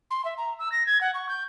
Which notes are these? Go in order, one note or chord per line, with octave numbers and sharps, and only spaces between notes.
C6
E5
A#5
E6
A#6
G#6
F#5
C#6
G6